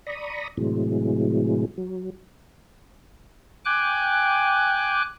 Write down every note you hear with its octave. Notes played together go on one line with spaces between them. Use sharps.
D5 A#5 B5 C#6 D#6
A2 C3 E3 F#3 G#3
F#3
G5 G#5 D6 F#6